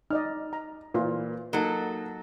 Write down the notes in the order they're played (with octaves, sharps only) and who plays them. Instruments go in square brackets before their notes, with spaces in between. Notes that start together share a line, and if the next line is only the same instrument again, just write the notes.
[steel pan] D#4 D5 D#5 [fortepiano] F6
[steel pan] A#5
[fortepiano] A#2 E3 [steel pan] F4 B4
[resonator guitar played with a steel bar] F#3 A4 [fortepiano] A#3 D#4 F#4